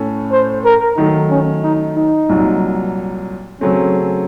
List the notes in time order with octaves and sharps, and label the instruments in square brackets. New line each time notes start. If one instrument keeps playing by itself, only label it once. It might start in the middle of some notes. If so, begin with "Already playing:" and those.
Already playing: [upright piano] A2 A3 C#4 A4
[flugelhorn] C5
A#4
[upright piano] D#3 F#3 A3 [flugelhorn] D#4
[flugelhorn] C#4
D#4
D#4
[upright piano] C2 A#2 F#3
[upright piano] C#3 F#3 A3 C4 [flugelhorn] C#4